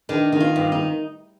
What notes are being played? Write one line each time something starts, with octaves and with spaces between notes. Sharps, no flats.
D#3 D4
D#3
F4
G2
D#4